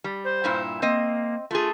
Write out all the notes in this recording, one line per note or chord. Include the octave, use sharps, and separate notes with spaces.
G3
C5
G2 A#2 E4
A#3 C4 D#5
A3 F4 G#4